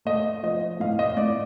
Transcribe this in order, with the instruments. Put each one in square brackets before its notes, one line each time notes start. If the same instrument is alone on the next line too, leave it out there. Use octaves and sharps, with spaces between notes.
[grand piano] A3 D#5
F3 D#5
A2 F5
D#5
A2 D5